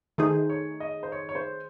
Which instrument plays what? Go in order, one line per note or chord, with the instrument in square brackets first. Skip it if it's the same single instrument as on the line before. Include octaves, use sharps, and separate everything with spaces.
[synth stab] D#3 A3 D#4 G#4 [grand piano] C5
[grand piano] C#5
D#5
C5
C#5
C#5
C5